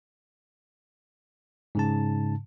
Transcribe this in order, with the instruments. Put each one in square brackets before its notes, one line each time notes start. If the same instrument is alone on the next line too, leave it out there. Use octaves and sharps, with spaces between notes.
[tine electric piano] G#2 C#3 A5